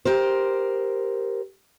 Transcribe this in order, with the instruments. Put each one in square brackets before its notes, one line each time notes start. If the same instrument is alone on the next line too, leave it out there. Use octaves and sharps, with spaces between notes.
[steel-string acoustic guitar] G4 A#4 C5